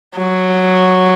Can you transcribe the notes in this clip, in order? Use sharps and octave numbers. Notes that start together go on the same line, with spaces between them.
F#3